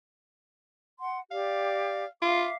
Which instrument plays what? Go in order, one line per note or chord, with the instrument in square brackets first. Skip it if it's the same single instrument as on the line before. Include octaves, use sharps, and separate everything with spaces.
[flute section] F#5 C6
[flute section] G4 D5 [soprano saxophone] F5
[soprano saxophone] F4 [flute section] E5 F5 D6